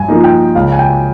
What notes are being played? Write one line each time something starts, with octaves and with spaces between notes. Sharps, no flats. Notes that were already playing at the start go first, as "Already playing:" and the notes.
Already playing: G2 G#5
F3 A#3 D#4
G5
C#2 F5
G#5
G5